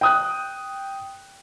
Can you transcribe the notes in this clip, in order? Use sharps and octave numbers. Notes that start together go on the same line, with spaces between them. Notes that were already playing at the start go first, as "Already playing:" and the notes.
G5 D#6 F#6